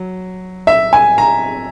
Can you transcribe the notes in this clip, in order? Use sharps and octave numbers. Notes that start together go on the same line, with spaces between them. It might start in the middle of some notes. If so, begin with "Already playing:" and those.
Already playing: F#3
E5
G#5
A#5